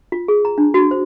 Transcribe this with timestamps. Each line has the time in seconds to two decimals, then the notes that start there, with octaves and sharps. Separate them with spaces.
0.12 F4
0.28 G#4
0.45 A#5
0.58 D4
0.74 F#4
0.91 C5